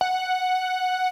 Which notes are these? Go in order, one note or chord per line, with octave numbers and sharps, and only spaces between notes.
F#5